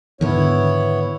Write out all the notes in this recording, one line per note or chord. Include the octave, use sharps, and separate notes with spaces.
G#2 D3 D#3 B3 E4 C#5